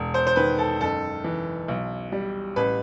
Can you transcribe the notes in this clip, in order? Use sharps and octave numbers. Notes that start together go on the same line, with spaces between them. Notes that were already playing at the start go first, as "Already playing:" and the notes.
Already playing: E1
C5
C5
D#3 B4
A4
F#1 A4
E3
B1
G3
A1 B4